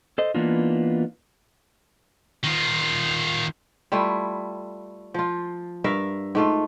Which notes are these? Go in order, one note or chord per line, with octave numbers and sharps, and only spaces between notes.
A4 C5 D#5
E3 A#3 B3 D4 D#4 F4
D#3 F4
G3 A3 E4 F4
F3 F4
G2 A#4 E5 F5
G#2 A3 F4